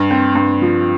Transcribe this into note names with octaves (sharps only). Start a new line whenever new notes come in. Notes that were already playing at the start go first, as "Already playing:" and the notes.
Already playing: G2
C4
G2
F3